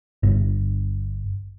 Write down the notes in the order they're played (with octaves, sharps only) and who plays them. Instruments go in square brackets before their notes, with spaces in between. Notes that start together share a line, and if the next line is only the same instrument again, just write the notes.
[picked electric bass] G1